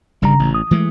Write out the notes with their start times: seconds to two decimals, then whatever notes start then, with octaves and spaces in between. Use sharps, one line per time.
0.22 G1 G2 C#3 G3 A#5
0.39 A1
0.54 D#6
0.71 E3 G#3 A3